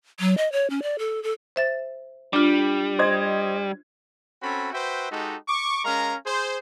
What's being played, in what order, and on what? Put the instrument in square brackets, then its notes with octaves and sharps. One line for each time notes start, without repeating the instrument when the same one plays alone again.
[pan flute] F#3
D#5
C#5
C#4
D5
A4
A4
[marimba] C5 E5 A6
[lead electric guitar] G3 [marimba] D4 F4
[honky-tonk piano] C5 D#5 G#6
[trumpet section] C4 C#4 F#4 A4 B5
F#4 B4 C5 E5 G5
G#3 D#4 F#4 G4 A4
C#6 D6
G#3 C#4 A#4 F5 A#5
G#4 C5